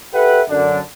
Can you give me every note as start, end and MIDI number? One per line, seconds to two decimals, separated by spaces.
0.13 0.41 67
0.13 0.41 69
0.13 0.41 71
0.13 0.41 76
0.13 0.41 78
0.13 0.41 79
0.49 0.79 42
0.49 0.79 50
0.49 0.79 62